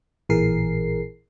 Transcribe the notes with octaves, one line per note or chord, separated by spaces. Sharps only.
A1 A#2 E3 G#4 A#4 C7